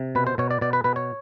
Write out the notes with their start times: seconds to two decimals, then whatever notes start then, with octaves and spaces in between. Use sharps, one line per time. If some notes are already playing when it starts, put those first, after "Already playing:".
Already playing: C3
0.15 B2 B4
0.27 C5
0.38 B2 C#5
0.51 D5
0.61 B2 D5
0.73 B4
0.84 B2 B4
0.96 C#5